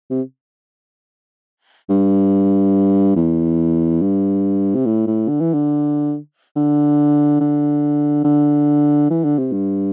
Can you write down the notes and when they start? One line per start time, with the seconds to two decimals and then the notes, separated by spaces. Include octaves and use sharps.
0.10 C3
1.90 G2
3.16 E2
4.02 G2
4.75 C3
4.86 A2
5.07 A2
5.29 D3
5.40 E3
5.53 D3
6.56 D3
7.41 D3
8.25 D3
9.10 E3
9.24 D3
9.38 C3
9.52 G2